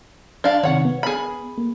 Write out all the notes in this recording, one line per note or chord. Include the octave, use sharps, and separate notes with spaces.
D4 F5
C3 D#3 C#5 F#5
B3
G#4 B5
A#3